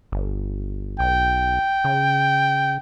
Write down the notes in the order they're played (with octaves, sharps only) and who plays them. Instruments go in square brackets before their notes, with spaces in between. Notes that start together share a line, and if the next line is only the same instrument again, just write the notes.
[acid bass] G1
[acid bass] B1 [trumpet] G5
[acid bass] C#3